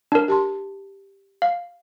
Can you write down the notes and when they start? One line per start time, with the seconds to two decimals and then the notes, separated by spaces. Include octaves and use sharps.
0.12 D4 A#4
0.28 G4 A5 C6
1.42 F5